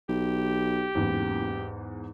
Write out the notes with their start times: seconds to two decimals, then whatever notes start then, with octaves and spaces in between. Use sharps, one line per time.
0.09 B1 G4
0.95 F#1 E2 G#2